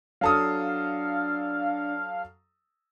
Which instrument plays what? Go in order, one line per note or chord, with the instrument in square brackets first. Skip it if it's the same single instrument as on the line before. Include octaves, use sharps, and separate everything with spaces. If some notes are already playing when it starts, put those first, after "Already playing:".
[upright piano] F#3 A4 D#6 [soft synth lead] D4 [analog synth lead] F5